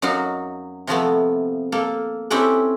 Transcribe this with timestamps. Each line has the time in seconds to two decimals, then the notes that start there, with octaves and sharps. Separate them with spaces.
0.02 F#2 F#3 D#4 F#4 F5
0.87 C3 F3 A3 B3
1.72 A#3 A4
2.30 C4 C#4 E4 G4 A4 B4